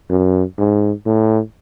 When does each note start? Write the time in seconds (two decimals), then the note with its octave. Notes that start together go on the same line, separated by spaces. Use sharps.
0.09 F#2
0.58 G#2
1.06 A2